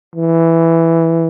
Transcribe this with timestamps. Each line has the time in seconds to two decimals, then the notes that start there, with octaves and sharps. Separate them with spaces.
0.16 E3